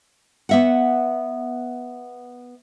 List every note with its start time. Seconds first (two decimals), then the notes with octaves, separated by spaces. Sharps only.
0.49 B3 E5 F#5